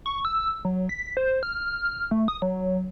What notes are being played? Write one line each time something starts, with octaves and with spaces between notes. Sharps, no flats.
C#6
E6
F#3
B6
C5
F6
A3
D#6
F#3